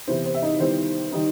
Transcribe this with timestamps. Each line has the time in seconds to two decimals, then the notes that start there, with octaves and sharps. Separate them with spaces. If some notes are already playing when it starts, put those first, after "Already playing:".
0.08 C3 E3 B3 E4 C5
0.26 C5
0.34 E5
0.42 D#4 D#5
0.60 D#3 G3 B3 E4 C5
1.12 D#3 G3 D#4